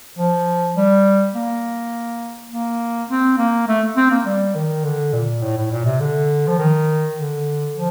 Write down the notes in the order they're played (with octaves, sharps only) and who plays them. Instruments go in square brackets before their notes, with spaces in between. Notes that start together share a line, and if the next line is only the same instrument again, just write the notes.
[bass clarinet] F3
G3
A#3
A#3
C4
A#3
A3
C4
A#3
G3
D#3
D3
A#2
A2
A2
A#2
C3
D3
F3
D#3
D3
F3